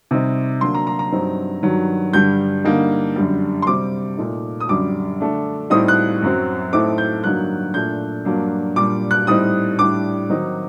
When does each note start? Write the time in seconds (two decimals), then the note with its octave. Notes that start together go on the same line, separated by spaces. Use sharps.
0.11 C3 G3 C4 D#4
0.61 D3 F#3 A#3 D4 C6
0.74 A#5
0.87 A#5
0.99 A#5
1.12 G2 F#3 C4 D#4
1.63 G2 D#3 F#3
2.13 G2 D3 G3 G6
2.64 D3 G3 A#3 D#4
3.16 F#2 D3 G3
3.62 C6
3.67 C3 G3 C4 D6
4.18 A#2 A3 D#4
4.60 D#6
4.69 F#2 D3 G3 D6
5.20 D3 A3 D4
5.70 A2 G3 C4 D#4 D#6
5.88 F#6
6.22 F#2 F#3 C4
6.73 A2 A3 C4 D#4 D6
6.98 G6
7.24 G2 D3 F#3 A#3 D#4 F#6
7.74 A#2 A3 D4 G6
8.25 G2 F#3 A#3 D4
8.76 A#2 G3 D4 D6
9.11 F#6
9.27 A2 G3 C4 D#4 D#6
9.78 A2 G3 D4 D6
10.29 D#3 F#3 C4 D#4